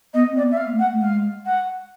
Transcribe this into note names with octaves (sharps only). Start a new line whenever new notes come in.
B3 D#5
C4
D5
B3
E5
F5
A#3
A3
F#5
A3
G#3 F5
F#5